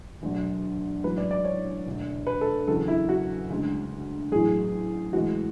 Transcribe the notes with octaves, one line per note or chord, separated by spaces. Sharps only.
E1 D2 D3 F#3
A1 G#2 F#3 B4
D5
D5
C#5
E1 D2 D3
B4
A4
F#1 E2 C#3 F#3 A4
E4
F#4
D2 C#3 G#3
A1 A2 F#3 G#4
A1 A2 E3 G#3 F#4